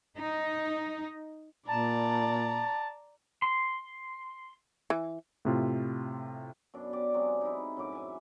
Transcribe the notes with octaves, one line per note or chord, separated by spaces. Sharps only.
D#4
A#2 D5 A5 A#5
C6
E3
A2 C3 F4
F#2 B2 D4
G4 D5
C3 F#3 G#3
D#4 E4
F#2 A2 D6
E5 G#5